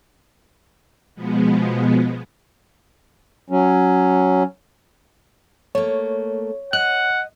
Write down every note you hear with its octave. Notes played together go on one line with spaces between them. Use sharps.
B2 F3 G#3 B3
F#3 C#4
A3 A#3 C#5
D#5 F#5 F#6